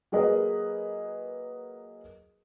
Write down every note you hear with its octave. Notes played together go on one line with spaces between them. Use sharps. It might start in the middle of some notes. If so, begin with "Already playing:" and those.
F#3 A#3 G#4 A#4 B4 D#5